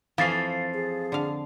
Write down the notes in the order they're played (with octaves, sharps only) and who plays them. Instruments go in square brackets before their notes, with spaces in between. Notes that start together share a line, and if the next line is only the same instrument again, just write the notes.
[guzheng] F2 F3 [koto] E3 [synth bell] F5 A6 C7
[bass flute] G#4
[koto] D3 F5